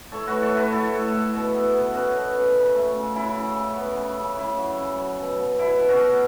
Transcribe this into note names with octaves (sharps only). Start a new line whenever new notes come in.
A2 A4 C#5
F#4 B4
A3
A4 C#5
A3 F#4 B4
A2 E4 A4
A2
A2
B2
B3
B3
B3 C#4 F#4
B2
B2
C#3
A3
C#3
C#3 E4
C#3
C#3
B3
C#3
C#3
C#3 E4
F#3
C#3
F#3
B2
B2
B2 E4
B2
C#4 F#4
B2